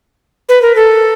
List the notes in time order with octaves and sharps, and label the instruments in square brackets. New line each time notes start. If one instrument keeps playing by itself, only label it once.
[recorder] B4
A#4
A4